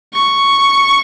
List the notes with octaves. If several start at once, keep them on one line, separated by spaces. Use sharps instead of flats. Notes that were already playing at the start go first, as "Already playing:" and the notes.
C#6